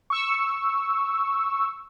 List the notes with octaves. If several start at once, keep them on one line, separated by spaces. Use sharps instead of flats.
C#6 E6